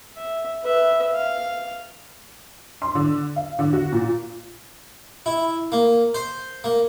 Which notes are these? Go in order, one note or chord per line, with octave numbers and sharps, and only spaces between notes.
E5
B4 E5
F5
C6
D3
F5
D3
F#4
A#2
E4
A#3
C5
A#3